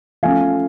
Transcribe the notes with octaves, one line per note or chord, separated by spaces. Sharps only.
F3 A3 C#4 F5 G#5